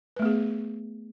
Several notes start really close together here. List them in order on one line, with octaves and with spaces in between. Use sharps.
B4 A3 B3 G#4